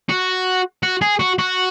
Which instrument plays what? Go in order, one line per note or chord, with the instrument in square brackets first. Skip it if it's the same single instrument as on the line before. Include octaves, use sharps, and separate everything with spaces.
[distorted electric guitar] F#4
F#4
G#4
F#4
F#4